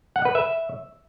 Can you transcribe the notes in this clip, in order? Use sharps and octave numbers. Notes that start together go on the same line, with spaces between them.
F#5
B4
E5